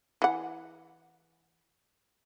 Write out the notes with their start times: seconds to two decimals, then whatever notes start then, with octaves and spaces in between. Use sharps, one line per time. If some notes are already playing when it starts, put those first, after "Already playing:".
0.22 E3 F#5